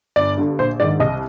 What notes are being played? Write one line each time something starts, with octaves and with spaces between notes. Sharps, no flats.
G1 D5
G2 D3
A#1 C5
G#2 D#3 D5
C2 D#5